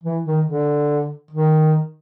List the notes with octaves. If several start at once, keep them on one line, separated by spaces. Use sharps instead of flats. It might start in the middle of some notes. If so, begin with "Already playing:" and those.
E3
D#3
D3
D#3